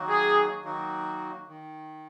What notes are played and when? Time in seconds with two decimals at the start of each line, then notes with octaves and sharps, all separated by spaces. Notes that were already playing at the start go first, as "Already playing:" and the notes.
Already playing: D#3 F#3 A#3 D#4 F#4
0.09 G#4
0.65 D#3 F#3 A#3 D#4 F#4
1.48 D#3